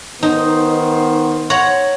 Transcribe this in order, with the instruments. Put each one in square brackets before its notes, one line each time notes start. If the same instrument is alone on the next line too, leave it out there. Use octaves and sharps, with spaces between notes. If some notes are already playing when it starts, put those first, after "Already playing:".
[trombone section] D#3 B3 C5 [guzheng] D#4
[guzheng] C#5 F#5 A#5